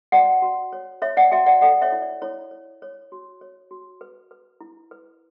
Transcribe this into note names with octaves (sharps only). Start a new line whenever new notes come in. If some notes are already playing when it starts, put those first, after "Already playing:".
F#4 D5 F#5
F#4
C#5
C#5 E5
D5 F#5
F#4 E5 G5
D5 F#5
A4 D5 F#5
C#5 E5
E4
D5
E4 C#5
C#5
C#5
F#4
C#5
F#4
B4
B4
E4
B4